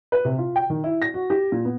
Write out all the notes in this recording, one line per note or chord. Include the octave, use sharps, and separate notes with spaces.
B4
C3
F4
G5
D#3
E4
A#6
F#4
G4
A#2
B3